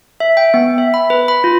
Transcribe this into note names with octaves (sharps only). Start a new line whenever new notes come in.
E5
G5
B3
E5
B5
B4
B5
F4